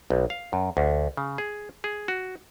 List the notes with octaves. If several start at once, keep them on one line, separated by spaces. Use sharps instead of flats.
B1
F5
F#2
D2
C#3
G#4
G#4
F#4